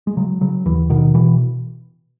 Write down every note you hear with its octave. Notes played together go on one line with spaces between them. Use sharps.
G#3
C#3 F#3
C#3 F#3
D#2 E3
B2 D#3
B2 E3